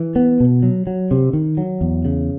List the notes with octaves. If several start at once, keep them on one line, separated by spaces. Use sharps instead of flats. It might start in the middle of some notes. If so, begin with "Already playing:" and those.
Already playing: E3
B3
B2
F#3
F#3
C3
D#3
F#3
E2
C#3